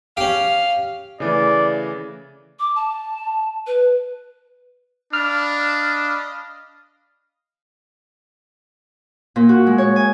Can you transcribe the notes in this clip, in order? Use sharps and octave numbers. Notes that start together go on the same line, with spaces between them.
C#4 G4 F5
C#3 E3 A3 D5
D6
A5
B4
D4 D#5 F5 B5 F6
A#2
F#4
G#3
C#5
G#5